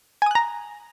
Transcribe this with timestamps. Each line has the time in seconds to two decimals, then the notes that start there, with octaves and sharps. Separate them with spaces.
0.22 G#5
0.26 D#6
0.31 F#6
0.35 A#5